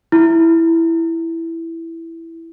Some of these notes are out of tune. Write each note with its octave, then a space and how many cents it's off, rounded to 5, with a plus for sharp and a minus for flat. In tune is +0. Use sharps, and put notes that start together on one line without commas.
E4 +5